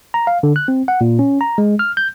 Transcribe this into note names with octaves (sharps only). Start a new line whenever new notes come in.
A#5
F5
D3
F#6
C4
F#5
A#2
C#4
A#5
G#3
F6
G6